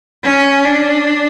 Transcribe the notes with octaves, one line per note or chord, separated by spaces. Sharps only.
C#4
D4